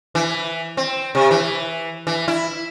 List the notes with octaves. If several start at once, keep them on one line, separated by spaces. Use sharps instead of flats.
E3
C4
C3
E3
E3
E4